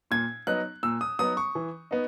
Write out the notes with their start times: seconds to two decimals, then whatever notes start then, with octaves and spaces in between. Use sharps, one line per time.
0.11 A#2 G#6
0.47 F#3 B3 D#4 F#6
0.83 A#2 E6
1.01 D#6
1.19 F#3 B3 D#4 D#6
1.37 C#6
1.55 E3
1.91 B3 D#4